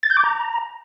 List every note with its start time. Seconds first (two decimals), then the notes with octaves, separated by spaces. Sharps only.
0.03 A6
0.10 G6
0.17 D6
0.24 A#5